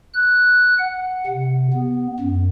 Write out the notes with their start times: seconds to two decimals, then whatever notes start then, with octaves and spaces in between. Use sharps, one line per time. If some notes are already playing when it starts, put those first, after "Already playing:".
0.14 F#6
0.78 F#5
1.26 C3
1.73 B3
2.20 F#2